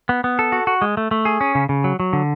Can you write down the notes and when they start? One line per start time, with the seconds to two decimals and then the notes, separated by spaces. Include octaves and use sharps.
0.09 B3
0.24 B3
0.39 A4
0.52 F#4
0.67 F#4
0.82 G#3
0.97 A3
1.11 A3
1.25 G#4
1.41 C#4
1.55 C#3
1.69 C#3
1.84 F#3
2.00 F#3
2.13 D3